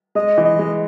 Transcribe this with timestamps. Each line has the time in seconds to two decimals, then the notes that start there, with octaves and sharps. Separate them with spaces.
0.15 G#3 D#5
0.38 E3
0.45 D#5
0.59 G#3